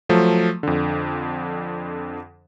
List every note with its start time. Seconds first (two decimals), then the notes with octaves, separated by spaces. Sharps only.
0.09 F3 F#3 A3
0.63 F2 D3